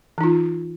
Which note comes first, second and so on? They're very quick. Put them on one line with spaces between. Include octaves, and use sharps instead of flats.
E3 D#4 F4